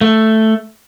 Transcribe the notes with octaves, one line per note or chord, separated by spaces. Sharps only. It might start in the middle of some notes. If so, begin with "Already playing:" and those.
A3